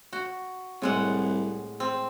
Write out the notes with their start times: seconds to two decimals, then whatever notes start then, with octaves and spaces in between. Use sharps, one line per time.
0.13 F#4
0.82 C2 A2 G#3 F#5
1.80 C4